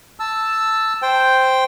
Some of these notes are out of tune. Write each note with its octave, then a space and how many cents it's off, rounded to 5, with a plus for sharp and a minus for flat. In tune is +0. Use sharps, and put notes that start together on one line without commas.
A5 +0 E6 +0
C5 +0 G5 +0